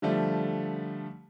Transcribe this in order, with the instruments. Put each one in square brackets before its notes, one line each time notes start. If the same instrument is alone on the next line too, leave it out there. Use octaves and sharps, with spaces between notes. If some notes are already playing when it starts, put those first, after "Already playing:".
[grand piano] D3 F3 G3 A3